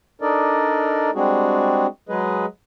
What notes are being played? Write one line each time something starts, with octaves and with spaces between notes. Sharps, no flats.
D4 D#4 A4 A#4 D5 D#5
G3 G#3 C4 D4 F#4 G#4
F#3 G#3 G#4 B4 D#5